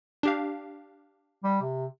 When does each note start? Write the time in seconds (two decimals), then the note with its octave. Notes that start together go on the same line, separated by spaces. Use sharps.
0.23 D4 G4 F5
1.44 G3
1.61 C3